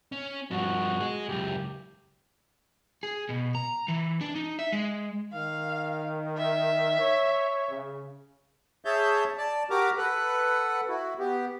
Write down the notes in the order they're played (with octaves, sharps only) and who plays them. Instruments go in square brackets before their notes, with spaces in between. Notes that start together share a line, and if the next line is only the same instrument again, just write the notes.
[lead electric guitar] C#4
[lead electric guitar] G2 F3 [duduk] F#4
[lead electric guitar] G#3 G#4
[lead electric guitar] C#2 F#2 [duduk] G4
[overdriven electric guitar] G#4
B2
A#5
E3
D4
D#4
E5
G#3
[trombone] D#3 [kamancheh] F5
[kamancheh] E5
[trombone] C#5
C#3
[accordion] G#4 C#5 E5 A5 G6
D5 A5
F#4 G4 A#4 A#5 D6
A4 B4 F#5
E4 F#4
B3 G4